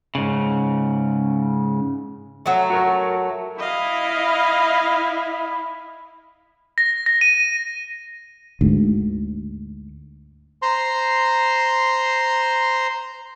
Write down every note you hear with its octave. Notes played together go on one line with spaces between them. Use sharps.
G#2 C#3
F#3 A3
F#4 A#4
E4 D#5 F5
A#6
A#6
D#7
D2 G#2
C5 A#5 C6